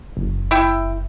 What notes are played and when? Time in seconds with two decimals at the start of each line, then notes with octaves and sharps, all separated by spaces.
0.17 F#1
0.51 E4 E5 G5